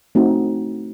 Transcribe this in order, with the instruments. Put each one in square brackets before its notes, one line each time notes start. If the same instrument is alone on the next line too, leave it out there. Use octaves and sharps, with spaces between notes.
[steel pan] A3 C4 D#4 F#4